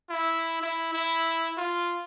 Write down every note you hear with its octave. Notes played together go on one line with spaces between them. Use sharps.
E4
E4
E4
F4